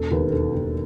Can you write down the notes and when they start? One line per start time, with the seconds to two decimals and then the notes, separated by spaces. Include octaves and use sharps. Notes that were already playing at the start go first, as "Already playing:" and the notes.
Already playing: E1 A4
0.11 D#2 D#3 B4
0.32 E1 A4
0.53 D#2 D#3